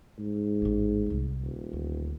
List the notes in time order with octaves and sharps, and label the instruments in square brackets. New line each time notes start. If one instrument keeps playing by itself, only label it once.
[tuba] G#2
[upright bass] A1 A#3
C2 G3
[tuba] D#1
[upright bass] D2